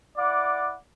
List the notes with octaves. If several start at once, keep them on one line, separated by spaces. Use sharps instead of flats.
E4 D5 F#5 D6